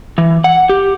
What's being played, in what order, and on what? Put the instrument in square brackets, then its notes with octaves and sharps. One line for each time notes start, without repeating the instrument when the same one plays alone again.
[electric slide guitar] E3
F#5
G4